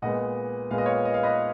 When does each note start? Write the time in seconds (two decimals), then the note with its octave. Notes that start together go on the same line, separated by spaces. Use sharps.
0.02 A#2 G#3 B3 D#5 F#5
0.71 A#2 G#3 B3 F5
0.78 D#5
0.86 C#5 F5
1.05 D#5
1.14 F5
1.23 B4 D#5